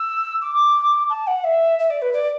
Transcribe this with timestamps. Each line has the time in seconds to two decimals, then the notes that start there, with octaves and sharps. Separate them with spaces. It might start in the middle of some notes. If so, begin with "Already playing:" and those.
Already playing: E6
0.41 D6
1.09 A5
1.27 F#5
1.44 E5
1.79 E5
1.90 D5
2.02 B4
2.13 D5